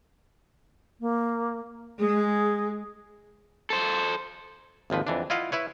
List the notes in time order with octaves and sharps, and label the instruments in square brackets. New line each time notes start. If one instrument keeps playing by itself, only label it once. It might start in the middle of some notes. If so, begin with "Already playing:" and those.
[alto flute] A#3
[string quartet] G#3 [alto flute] G#4
[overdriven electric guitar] A4 C5
[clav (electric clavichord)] G#1 D#2 F3 B4
F2 E3 D4
E4 F4 D#5 F5 F#5
E4 B4 C#5